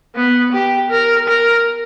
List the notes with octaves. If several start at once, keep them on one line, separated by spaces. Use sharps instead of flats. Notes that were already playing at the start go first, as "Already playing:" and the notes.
B3
G4
A#4
A#4